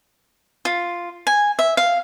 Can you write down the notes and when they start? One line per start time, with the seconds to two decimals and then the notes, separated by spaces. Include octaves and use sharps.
0.65 F4
1.27 G#5
1.59 E5
1.77 F5